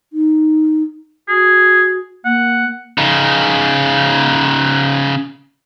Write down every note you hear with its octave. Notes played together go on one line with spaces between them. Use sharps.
D#4
F#4 G#4
A#3 F#5
C#3 D#4